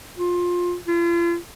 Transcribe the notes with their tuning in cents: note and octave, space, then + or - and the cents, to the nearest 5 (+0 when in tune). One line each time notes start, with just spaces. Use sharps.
F4 +15
F4 -40